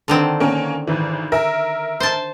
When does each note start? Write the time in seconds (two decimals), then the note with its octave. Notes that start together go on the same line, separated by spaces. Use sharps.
0.08 D3 D#3 C4
0.40 A#3 C#4
0.87 G#1 E3
1.32 A#4 E5
2.00 C5 A5